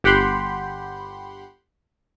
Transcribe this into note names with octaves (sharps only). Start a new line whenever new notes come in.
G1 G4 F#5 B5 C6 G6